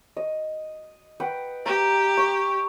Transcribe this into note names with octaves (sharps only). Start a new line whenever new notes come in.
D#5
B4 F#5 G5
G4 A#5
C#6